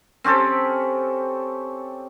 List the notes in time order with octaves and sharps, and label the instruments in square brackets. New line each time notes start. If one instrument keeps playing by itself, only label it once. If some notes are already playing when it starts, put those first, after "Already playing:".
[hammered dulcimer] C4 C#4 G4 A4